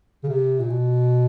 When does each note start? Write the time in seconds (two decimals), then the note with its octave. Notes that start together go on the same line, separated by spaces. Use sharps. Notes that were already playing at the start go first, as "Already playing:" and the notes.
0.23 C#3
0.29 C3
0.60 A#2
0.70 B2